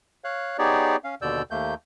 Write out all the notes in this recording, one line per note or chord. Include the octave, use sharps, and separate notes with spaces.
C#5 F5 F#6
B3 D#4 G4 G#4 C#5 D5
C#4 F5
D#2 B2 D3 D5 E6 G6
D#2 A3 A#3 G6